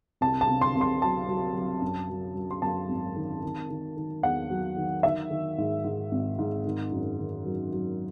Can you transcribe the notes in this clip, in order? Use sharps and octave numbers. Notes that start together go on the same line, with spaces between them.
C2 A5
A5
C3
C6
C2
C6
F#3 A5
F#3
F#3
F#2
F#3
F#3
C6
F#2 A5
G#1
D#3
D#3
D#3
D#3
E2 F#5
F#3
D#3
D#3 E5
D#3
G#2
G#2
G#1
G#2
D#3
F#2
D#3
F#3
F#3